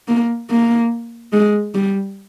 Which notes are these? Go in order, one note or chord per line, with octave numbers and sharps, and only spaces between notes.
A#3
A#3
G#3
G3